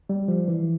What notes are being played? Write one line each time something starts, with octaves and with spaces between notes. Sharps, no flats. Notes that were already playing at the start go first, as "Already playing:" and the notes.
G3
F3
E3